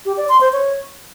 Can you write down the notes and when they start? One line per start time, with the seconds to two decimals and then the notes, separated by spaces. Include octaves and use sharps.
0.05 G4
0.17 D5
0.29 C6
0.41 C5
0.53 C#5